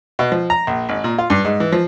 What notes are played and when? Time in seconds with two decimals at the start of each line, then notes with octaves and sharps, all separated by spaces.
0.19 B2
0.32 F3
0.50 A#5
0.67 A#1
0.89 G#1
1.04 A#2
1.18 F4
1.30 G2
1.45 G#2
1.60 E3
1.72 F3